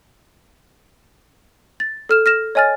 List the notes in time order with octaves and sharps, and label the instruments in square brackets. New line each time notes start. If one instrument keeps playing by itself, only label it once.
[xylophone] A6
A4 F6 E7
F6 A#6 E7
C#5 D#5 G#5 F6 A6